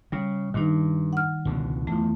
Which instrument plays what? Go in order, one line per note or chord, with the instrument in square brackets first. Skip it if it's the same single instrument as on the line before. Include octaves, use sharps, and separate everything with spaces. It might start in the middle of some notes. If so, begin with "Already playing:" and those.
[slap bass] C#3 [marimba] G3
[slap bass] G2 [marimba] D#3 D#4
[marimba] F#5 F6
[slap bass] C#2 B2 D3
[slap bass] E2 F3 [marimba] A3